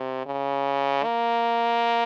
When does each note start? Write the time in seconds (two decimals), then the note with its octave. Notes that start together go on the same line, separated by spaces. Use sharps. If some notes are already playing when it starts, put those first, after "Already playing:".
Already playing: C3
0.26 C#3
1.04 A#3